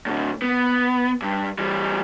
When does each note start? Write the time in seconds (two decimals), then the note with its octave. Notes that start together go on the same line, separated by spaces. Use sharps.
0.06 A2 D3
0.42 B3
1.22 G2
1.58 E3 G3